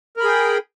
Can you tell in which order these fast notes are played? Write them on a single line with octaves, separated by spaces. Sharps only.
A#4 B5 G#4 G5